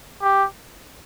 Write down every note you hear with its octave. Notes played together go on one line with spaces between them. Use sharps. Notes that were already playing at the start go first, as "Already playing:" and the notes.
G4